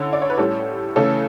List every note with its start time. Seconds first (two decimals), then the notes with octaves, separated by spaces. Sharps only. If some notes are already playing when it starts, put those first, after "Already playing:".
Already playing: D3 C#4 E4 A4
0.13 D5
0.22 C#5
0.30 B4
0.38 A2 G3 C#4 A4
0.96 C#3 E3 A3 C#4 A4